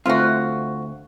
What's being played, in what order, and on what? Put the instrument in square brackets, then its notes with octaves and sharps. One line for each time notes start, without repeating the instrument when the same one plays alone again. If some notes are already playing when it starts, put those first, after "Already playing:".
[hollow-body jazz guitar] D2 A3 C4 [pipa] F4 F#4